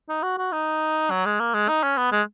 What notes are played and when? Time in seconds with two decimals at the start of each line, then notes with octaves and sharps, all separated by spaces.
0.09 D#4
0.23 F#4
0.38 F#4
0.52 D#4
1.11 F#3
1.25 G#3
1.40 A#3
1.54 G#3
1.68 D#4
1.83 C#4
1.97 B3
2.12 G#3